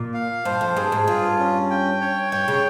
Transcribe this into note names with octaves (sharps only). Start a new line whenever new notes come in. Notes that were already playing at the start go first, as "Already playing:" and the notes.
Already playing: A#2
F5
G2 C5
F2
G2 G#4
G#2
G2 F4
C#4
G5
C#5
G2 G5
C#3